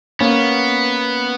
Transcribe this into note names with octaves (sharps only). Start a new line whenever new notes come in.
A#3 B3 C#4